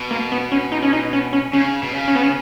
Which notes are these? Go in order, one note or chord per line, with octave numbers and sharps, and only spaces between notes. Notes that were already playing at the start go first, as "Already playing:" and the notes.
Already playing: B2
A#3
B3
C#4
D#4
C#4
D#4
C#4
C#4
C#3 C#4
B2
C#3
C#4
B3
C#4